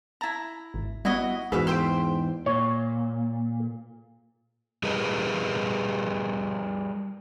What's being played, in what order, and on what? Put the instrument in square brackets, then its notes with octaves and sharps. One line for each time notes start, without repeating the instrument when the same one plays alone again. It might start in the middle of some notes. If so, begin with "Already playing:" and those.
[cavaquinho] E4 A#5 [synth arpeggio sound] A5
[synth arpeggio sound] G#1
[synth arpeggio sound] G3 B3 [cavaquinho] E4 F#4 D#5
[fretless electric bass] E2 G#2 [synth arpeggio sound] F#4 G#4 [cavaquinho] B4 E5 F5
[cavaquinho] C5 G5 C6 [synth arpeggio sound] E6 B6 D7
[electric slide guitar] A#2 [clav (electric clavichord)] C#5
[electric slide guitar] G3 G4 G#4 A#4 B4 D#5